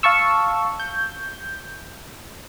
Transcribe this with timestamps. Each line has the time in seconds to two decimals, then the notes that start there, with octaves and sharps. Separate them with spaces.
0.03 F5 A5 C#6 E6
0.79 G6